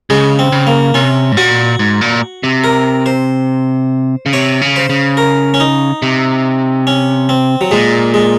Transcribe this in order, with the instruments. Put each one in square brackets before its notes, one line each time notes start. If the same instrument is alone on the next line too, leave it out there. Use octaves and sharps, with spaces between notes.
[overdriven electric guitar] C#3 [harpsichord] G#3
[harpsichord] C4
[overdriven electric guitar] C#3
[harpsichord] A#3
[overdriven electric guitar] C3 [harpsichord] C#4
[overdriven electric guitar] G#2
[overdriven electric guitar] A#2 [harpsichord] F#4
[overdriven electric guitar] G#2
A#2
C3
[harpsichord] A#4
C5
[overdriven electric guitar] C#3
[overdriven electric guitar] C3 [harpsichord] C#5
[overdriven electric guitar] C#3
[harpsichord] C5
[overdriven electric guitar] C#3
[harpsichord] A#4
C#4
D#4
[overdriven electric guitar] C3
[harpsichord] C#4
C4
F#3
[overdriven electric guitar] A#2 [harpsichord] G#3
[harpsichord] G#3